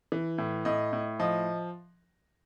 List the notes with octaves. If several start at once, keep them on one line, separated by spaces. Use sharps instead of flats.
E3
A2
A2 D#5
A2
F3 D#5